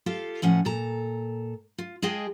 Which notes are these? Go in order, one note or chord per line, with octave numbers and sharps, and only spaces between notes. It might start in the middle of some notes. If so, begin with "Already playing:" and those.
F4 G4 A4 F5
A2 F3 C#4 F#5
A#2 A4 A#5
F4
G#3 F4 G#4 D#5 G5 A5